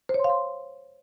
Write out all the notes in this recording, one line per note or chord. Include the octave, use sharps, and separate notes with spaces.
C5
C#5
C6
F5
C6